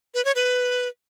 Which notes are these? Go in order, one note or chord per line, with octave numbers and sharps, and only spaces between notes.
B4
C#5
B4